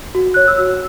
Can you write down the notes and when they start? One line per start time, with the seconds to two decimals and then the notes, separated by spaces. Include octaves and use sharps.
0.15 F#4
0.34 C#5 F#6
0.48 E6
0.58 F#4